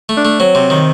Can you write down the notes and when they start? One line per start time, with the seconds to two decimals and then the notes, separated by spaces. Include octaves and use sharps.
0.09 A3
0.17 D4
0.25 A3
0.40 F#3 C4
0.55 C3
0.70 D#3